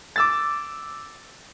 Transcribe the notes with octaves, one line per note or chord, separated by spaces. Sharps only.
D6 E6 A6